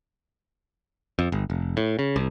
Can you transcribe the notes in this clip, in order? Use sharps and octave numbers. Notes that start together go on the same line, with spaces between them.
F2
G1
F1
A2
C#3
C2